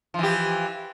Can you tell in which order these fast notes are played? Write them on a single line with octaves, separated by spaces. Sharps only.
F3 E3 G4